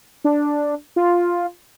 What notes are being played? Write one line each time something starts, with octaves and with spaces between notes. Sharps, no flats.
D4
F4